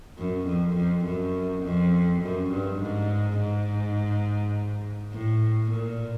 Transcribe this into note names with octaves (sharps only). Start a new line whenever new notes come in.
F#2
F2
F2
F#2
F2
F#2
G2
G#2
G#2
A2
A#2